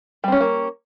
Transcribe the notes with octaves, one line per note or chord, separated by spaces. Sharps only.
G3 A3 A#3 C4 C#4